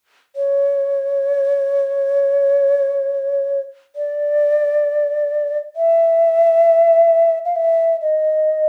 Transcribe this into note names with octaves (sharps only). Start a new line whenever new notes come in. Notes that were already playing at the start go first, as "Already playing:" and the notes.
C#5
D5
E5
F5
E5
D#5